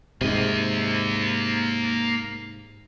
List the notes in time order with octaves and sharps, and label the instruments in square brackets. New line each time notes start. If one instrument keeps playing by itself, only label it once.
[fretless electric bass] G#2 C3 [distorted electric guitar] A#3 D#5